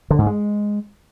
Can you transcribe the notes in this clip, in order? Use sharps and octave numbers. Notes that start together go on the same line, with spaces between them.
D3
G#2
G#3